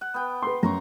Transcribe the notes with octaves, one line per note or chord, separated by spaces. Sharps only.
F#5
B3 G5
B4 C6
F#2 A#5 C6 C#6